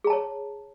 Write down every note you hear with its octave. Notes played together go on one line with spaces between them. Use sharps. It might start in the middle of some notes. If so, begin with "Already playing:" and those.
G#4 C#5 A5 A#5